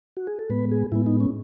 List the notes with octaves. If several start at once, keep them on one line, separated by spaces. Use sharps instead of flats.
F#4
G#4
A4
A2 G#3 B3 B4
G#4
A2 G#3 B3 E4
D#4
C#4